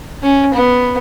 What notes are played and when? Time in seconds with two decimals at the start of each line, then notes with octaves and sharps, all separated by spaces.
0.23 C#4
0.54 B3